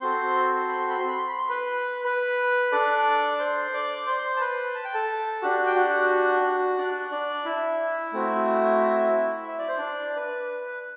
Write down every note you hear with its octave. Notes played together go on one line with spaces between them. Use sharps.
C4 F#4 A4 C5 C6
B5
C6
B5
C6
B5
C6
B5
C6
B4 B5
B4 B5
D4 A4 D5 D6
C5 C6
D5 D6
C5 C6
A5
B4 B5
A5
G5
A4 A5
D4 F#4 G4 F#5
G5
F#4 F#5
D4 D5
D4 D5
E4 E5
A3 C4 F#4
E5
D5
C5
D4 D5
B4